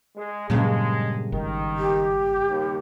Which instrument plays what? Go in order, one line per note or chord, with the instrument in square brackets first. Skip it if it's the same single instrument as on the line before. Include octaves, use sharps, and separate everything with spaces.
[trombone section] G#3
[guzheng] G2 C#3 A#3 [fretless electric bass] A#2 F#3 [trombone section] G#3
[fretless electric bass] G#1 [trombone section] D#3
[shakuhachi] G4
[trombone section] D#2